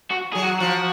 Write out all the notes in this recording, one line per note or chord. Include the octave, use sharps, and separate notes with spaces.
F#4
F#3 G#4
F#4
F3 F#4